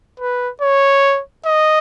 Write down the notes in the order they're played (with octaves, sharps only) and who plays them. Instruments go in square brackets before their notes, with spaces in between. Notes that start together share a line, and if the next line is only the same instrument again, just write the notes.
[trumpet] B4
C#5
D#5